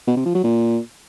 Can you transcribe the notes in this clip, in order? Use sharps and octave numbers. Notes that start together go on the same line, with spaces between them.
B2
C3
F3
F#3
A#2